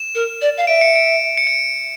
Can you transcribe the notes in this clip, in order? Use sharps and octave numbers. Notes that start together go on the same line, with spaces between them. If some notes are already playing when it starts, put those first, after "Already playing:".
Already playing: E7
A#4
D5
F5
E5 D7
C#7
D7
C#7
D7